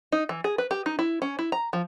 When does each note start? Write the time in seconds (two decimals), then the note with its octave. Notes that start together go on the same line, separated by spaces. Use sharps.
0.12 D#4
0.29 E3
0.44 G#4
0.58 B4
0.71 G4
0.86 D#4
0.99 E4
1.22 C#4
1.39 E4
1.52 A#5
1.73 F3